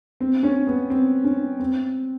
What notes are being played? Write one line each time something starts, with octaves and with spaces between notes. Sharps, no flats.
C4
C#4
B3
C4
C#4
C4